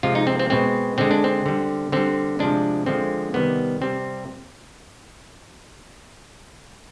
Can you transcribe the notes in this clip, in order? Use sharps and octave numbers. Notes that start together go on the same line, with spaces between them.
C3 F3 G#3 F4
D#4
C4
C4
B2 G#3 C4
D3 G#3 C4
D4
C4
D3 G3
D3 G3 C4
C3 F3 G#3 D4
D3 F3 G#3 C4
C3 D#3 G3 B3
C3 G3 C4